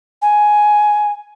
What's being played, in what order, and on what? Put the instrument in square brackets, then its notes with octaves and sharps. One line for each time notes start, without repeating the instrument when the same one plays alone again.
[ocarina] G#5